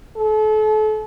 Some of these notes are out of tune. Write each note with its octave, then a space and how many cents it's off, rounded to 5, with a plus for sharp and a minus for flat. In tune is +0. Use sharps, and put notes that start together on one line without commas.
A4 -35